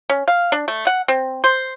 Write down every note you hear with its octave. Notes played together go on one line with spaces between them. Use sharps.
C#4
F5
D4
A3
F#5
C4
C5